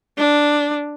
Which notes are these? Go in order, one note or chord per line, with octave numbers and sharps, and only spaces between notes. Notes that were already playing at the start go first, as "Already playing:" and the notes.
D4